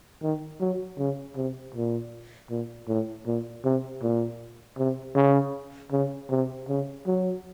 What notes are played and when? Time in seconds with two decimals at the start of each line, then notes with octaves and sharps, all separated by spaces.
0.23 D#3
0.60 F#3
0.98 C#3
1.37 C3
1.75 A#2
2.50 A#2
2.88 A2
3.27 A#2
3.64 C3
4.03 A#2
4.78 C3
5.16 C#3
5.92 C#3
6.30 C3
6.69 C#3
7.07 F#3